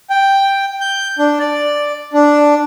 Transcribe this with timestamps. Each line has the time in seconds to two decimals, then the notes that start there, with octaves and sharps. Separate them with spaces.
0.10 G5
0.81 G6
1.19 D4
1.39 D5
2.13 D4